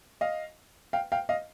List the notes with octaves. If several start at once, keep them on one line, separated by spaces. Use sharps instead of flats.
D#5 F5
F5 G5
F5 G5
D#5 F5